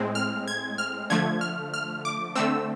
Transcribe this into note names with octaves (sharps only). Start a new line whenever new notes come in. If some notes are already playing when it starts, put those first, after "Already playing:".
Already playing: A2 G#3 C4
F6
G#6
F6
D3 F3 A3 G#6
F6
F6
D6
D3 A3 C4 E6